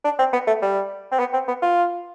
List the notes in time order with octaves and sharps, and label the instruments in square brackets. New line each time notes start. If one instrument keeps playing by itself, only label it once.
[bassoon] D4
C4
B3
A3
G3
C4
B3
C4
B3
F4